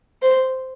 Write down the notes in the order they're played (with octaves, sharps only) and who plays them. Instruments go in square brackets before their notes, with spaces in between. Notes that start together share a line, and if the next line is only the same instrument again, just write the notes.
[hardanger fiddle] C5